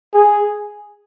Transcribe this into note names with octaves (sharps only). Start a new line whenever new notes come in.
G#4